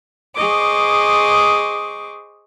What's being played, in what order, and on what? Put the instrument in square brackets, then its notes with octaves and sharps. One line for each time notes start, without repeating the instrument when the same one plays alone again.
[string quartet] G#4 C5 D#5 C#6 D6